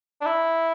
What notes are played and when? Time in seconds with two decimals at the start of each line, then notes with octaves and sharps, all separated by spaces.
0.21 D4
0.26 E4